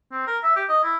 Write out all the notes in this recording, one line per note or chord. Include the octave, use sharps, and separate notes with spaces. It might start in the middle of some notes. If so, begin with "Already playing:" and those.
C4
A#4
E5
G4
D#5
E4